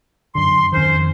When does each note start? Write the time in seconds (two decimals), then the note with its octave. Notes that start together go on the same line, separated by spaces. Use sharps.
0.35 F#2 D3 C6
0.73 F2 D#3 C#4 C5